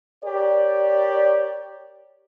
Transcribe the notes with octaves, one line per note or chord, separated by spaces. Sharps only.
G4 A#4 C#5 D5